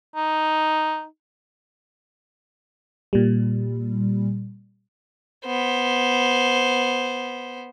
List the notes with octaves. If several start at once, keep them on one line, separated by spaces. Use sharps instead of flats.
D#4
A#2 G3
B3 C5